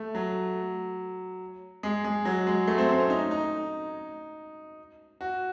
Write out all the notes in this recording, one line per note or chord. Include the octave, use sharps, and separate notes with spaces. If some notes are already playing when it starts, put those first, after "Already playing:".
Already playing: A3
F#3
G#3
G#3
F#3
G#3
A3
C4
C4
C#4
D#4
D#4
F#4